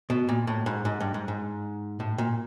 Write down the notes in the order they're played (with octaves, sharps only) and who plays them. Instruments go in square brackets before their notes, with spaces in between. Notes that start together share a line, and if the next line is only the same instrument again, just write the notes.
[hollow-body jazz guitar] B2
A#2
A2
G#2
G#2
G2
G#2
G#2
A2
A#2